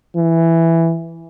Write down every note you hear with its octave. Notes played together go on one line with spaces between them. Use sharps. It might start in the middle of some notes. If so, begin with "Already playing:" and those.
E3